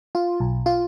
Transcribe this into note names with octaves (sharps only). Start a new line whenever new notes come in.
F4
B1
F4